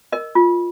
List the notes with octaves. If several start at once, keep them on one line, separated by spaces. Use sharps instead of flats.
A#4 D#5
F4